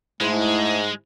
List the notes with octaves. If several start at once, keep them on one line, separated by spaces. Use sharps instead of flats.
G#2 G#3 A3 E4 C5